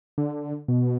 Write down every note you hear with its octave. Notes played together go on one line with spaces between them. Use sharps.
D3
B2